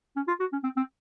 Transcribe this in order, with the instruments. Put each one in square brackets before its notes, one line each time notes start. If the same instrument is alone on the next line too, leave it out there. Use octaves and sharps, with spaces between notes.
[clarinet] C#4
F4
F#4
C#4
C4
C4